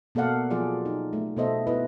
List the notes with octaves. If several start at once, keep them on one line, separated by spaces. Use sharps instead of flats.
B2 A#3 A4 D5 F5 F#5
F3 F#3 F4 G#4 D5
D#4
A3
B2 B3 A4 C5 D#5 E5
E4 B4 D#5